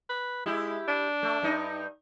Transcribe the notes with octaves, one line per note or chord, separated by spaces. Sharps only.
B4
G#3 E4 G4
D4
A3
G2 D#4